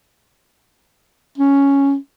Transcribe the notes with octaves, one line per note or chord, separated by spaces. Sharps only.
C#4